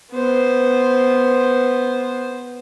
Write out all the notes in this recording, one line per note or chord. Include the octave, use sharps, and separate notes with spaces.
B3 C5